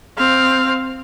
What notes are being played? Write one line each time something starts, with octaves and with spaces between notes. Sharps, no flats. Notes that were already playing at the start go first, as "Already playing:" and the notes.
C4 F5